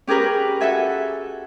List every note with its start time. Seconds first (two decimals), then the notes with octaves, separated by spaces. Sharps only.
0.07 C#4 G4 G#4 A#4 B4
0.61 F#4 A4 E5 G#5